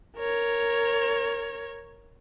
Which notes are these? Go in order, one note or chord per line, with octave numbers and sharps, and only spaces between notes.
A#4 C#5